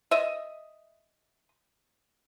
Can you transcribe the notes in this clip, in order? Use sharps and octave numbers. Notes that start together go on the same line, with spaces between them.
D#5 E5